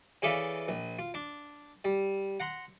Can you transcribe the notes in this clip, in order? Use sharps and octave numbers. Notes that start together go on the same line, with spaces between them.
C#3 E3 A4 D5 E5 F5
A#1
F4
D4
G3
F#5 A#5 C6